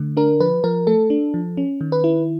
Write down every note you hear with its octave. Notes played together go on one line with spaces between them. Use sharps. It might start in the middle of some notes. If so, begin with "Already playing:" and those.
Already playing: D3 A3
D4 A#4
F3 B4
F3 A#4
A3 A4
D4
F3
C#4
D#3
B4
E4